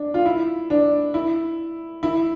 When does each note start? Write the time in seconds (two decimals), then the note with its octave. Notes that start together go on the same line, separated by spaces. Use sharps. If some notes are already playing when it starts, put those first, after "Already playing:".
Already playing: D4
0.14 F4
0.26 E4
0.70 D4
1.14 E4
2.03 E4